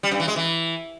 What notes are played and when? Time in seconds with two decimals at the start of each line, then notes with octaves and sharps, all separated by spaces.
0.03 G3
0.11 G2
0.20 E3
0.28 G#3
0.36 E3